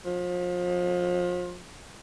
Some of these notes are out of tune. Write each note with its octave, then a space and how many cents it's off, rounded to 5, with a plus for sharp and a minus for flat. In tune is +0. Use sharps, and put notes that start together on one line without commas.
F3 +35